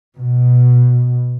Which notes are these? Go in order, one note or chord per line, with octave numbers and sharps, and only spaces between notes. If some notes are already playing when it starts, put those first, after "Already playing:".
B2